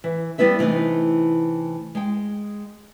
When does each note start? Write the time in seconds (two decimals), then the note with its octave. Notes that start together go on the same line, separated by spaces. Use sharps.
0.04 E3
0.38 G3 B3 E4 B4 E5
0.59 C3 E3 A3 D#4
1.95 G#3 G5